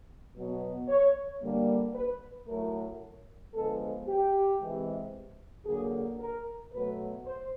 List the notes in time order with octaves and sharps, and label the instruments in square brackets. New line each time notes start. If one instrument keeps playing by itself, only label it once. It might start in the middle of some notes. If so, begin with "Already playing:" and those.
[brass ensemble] B2 F#3 B3
C#5
D3 G3 A#3
B4
A2 F#3 A3 A#4
D3 F3 G#3 B3 A4
G4
C3 E3 G#3
D3 F#3 A#3 G#4
A#4
B2 F#3 A3 B4
C5